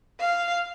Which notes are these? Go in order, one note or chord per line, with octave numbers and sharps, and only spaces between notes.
F5